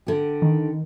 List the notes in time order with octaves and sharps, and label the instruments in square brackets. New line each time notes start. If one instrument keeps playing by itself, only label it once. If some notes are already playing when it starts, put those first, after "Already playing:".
[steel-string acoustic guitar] D3 G4
[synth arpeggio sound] D#3